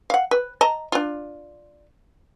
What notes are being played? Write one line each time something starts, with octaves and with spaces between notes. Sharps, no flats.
F5 F#5
B4
D#5 A5 A#5
D4 F4